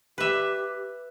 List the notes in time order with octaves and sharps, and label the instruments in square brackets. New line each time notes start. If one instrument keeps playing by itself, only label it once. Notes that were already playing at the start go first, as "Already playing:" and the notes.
[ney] G4 [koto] B4 E5